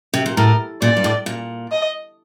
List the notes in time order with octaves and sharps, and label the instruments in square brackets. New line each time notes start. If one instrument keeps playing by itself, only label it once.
[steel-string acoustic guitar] C3
A#2
[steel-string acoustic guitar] A2 [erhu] A#4
[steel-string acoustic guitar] A#2 [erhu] D5
[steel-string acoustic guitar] G2
A2
A#2
[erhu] D#5